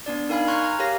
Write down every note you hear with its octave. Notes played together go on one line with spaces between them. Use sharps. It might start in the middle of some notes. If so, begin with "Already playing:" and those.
B3 D4 D5
D#4 A#4 F5 G#5 B5
A#5 C6 C#6 F6 F#6 G#6
G#5 A#5
G4 A#4 C#5 F5 A#6